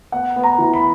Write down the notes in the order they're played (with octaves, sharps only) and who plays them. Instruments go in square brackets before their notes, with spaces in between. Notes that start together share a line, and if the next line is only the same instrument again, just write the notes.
[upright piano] B3 F#5
B3
A#5
E3
B5